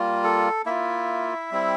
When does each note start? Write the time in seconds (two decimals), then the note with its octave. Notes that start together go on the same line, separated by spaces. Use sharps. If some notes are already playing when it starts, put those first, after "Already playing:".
Already playing: G3 A#3 F4
0.24 A4
0.66 A#3 E4 F4 E5
1.51 G3 C4 E4